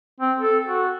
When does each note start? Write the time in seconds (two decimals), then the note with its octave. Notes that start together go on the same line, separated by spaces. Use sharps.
0.20 C4
0.40 A4
0.68 F#4